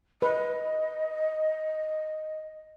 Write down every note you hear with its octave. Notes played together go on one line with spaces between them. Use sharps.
B4 D#5